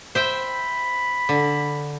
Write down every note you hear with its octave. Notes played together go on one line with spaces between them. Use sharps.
C5 E5 G5 B5
D3